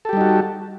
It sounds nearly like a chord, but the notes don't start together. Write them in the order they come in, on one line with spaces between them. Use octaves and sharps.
A4 G4 G3 D#4 F#4